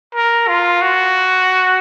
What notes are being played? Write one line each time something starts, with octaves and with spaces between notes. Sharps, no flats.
A#4
F4
F#4